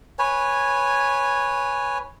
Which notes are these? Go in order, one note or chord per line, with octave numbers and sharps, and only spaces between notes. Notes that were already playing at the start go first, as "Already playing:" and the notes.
B4 C#5 G#5